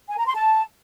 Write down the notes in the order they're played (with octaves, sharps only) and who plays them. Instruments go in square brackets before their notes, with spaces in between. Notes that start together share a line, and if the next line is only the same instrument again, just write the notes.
[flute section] G#5
A#5
C6
A5